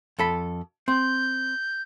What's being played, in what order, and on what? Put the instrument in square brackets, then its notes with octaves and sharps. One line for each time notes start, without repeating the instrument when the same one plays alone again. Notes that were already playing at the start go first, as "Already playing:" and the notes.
[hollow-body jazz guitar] F2 A4 B5
[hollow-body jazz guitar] C4 [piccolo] G6